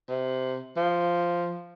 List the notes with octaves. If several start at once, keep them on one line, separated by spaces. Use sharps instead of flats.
C3
F3